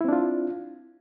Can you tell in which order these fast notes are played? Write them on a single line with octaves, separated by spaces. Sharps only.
E4 C4 D4 F4